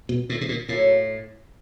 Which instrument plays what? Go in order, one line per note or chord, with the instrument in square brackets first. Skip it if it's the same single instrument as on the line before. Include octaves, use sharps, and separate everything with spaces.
[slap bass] B2
A2
B2
A#2
[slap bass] A2 [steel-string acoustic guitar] C#3 F#3 A#3